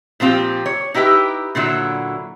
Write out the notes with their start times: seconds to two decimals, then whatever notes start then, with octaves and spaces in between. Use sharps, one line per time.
0.20 A#2 F3 C4 F4 G4
0.66 C#5
0.94 D#4 E4 G4 B4
1.55 A#2 D3 F#3 E4